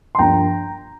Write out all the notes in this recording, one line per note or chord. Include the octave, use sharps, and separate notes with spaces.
C6
G2 F3 A#3 D4 G5 A#5